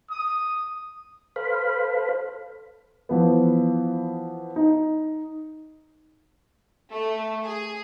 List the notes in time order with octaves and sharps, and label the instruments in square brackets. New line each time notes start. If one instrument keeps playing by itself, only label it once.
[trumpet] D#6
[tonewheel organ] A4 B4 C5 F5 B5
[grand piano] E3 F3 B3
D#4
[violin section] A3
G#4